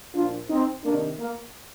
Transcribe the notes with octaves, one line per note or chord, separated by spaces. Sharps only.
A#2 F3 D4 F4
C4 D#4
C3 D#3 A#3 D4
A#3